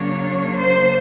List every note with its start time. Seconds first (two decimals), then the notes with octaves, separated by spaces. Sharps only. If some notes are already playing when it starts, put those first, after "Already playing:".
Already playing: C#3 F#3 A#3 D4 C#5
0.57 C5